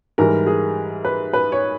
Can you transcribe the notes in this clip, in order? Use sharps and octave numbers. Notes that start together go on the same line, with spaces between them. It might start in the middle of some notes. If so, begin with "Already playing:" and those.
G#2 E3 G3 A#4
G#4
B4
B4
C#5